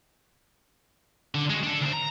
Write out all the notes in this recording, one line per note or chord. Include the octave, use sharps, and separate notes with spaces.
D3
G#3 F#4
D4 A4
D2 C5
A#5